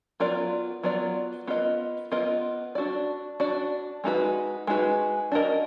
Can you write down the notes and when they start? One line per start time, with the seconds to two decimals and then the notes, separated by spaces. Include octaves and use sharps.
0.20 F#3 B3 F4 A#4 D5
0.83 F#3 B3 F4 A#4 D5
1.47 B3 F4 A#4 D#5
2.12 B3 F4 A#4 D#5
2.75 D4 F#4 D5
3.40 D4 F#4 D5
4.04 G#3 D#4 F#4 B4
4.67 G#3 D#4 F#4 B4
5.32 D4 F#4 A#4 D#5